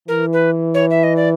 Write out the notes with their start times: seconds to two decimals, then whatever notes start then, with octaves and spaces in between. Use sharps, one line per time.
0.08 E3 A#4
0.33 B4
0.74 C#5
0.91 E5
1.04 D#5
1.16 D5